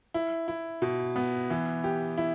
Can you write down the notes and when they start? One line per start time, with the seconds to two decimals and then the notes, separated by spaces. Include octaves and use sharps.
0.14 E4
0.48 E4
0.82 B2
1.16 B3
1.50 E3
1.84 G4
2.18 E4